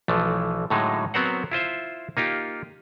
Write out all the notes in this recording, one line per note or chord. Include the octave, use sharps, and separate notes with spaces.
B1 E3 F3 A3
A2 D3 F#3 G#3 D#4
F#3 B3 C4 A#4 C5 F#5
E4 F4 C5 E5
A#3 D#4 F4 G4